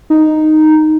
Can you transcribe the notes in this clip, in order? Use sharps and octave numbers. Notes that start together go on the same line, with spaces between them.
D#4